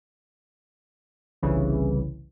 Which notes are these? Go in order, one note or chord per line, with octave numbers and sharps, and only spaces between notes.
G1 C2 C#3 E3